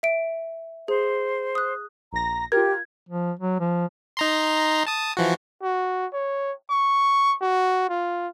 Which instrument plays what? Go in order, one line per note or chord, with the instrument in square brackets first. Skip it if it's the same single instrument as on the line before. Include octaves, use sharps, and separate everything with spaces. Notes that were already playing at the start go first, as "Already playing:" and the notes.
[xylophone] E5 D7
[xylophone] G#4 [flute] C5
[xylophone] D#6 F#6
[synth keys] A#1 A#6 [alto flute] A#5
[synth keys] F4 A#4 [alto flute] G4 [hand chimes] G#6
[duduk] F3
F#3
F3
[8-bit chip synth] D#4 A#5 C6
A5 D#6
E3 F3 F#4
[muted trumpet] F#4
C#5
C#6
F#4
F4